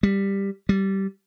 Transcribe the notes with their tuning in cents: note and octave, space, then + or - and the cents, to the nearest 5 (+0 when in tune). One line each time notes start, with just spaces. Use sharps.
G3 +10
G3 -15